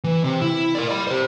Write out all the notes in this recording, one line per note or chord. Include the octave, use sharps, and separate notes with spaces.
E3
C3
E4
A#4 D5
D5 B5
G4 C5